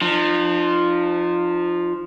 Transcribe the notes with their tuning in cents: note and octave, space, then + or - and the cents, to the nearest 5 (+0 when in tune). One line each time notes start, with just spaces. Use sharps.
F3 +0 D#4 -45